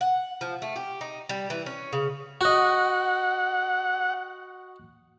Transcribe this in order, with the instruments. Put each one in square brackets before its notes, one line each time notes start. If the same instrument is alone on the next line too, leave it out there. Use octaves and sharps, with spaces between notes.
[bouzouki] F#5
F3
A3
G4
D#4
G3
E3
C#4
C#3
[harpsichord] F#4 D#5 [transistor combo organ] F#5